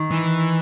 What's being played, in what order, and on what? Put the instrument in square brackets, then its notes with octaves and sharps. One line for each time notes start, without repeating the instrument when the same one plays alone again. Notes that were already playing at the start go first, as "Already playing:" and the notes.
Already playing: [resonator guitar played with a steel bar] D#3
[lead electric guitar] E3